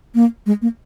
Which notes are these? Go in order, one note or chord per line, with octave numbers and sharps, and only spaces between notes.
A#3
G#3
A#3